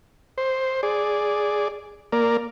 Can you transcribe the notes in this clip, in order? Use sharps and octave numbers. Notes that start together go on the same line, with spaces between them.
C5
G#4 D5
A#3 A#4 D5